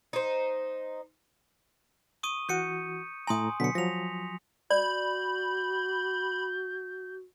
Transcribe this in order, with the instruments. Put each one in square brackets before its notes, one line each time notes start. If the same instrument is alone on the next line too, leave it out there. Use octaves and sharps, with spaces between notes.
[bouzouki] D#4 C5
[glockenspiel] C#6 D#6 D#7
[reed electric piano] E3 F#4 [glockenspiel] G6 C#7 D#7
[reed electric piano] A2 A#5 [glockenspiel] G#5 C6 D#6
[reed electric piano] B2 D3 F#3 [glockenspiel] B6 C#7
[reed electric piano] F3 F#3 [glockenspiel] A#6 F7
[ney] F#4 [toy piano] D5 [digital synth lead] B5 [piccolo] G6